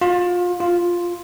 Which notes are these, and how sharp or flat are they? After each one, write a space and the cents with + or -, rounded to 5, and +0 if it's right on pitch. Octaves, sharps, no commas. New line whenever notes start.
F4 +25
F4 +0